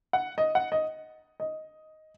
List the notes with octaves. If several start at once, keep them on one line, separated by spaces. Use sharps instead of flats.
F#5
D#5
F#5
D#5
D#5